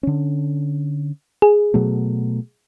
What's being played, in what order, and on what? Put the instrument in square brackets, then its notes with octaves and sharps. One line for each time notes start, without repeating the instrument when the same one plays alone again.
[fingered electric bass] D3 C#4
[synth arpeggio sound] G#4
[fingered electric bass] B2 F#3 A3